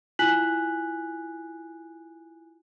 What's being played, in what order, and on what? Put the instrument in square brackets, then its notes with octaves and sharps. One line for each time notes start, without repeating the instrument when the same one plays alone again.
[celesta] E4 F4 G#5 F#6 B6 F#7